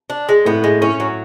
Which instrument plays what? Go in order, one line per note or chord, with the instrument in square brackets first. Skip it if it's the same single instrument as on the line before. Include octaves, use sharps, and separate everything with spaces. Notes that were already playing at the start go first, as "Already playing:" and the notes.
[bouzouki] D4
G#3
[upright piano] A2 [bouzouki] B3
[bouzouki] G#3
[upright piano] A2 [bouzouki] C#4
[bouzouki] F#3